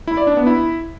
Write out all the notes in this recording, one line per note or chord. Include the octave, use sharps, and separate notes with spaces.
E4
D5
D4
B3
E4